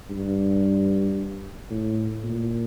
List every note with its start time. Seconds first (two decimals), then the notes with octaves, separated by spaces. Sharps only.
0.10 G2
1.70 A2
2.24 A#2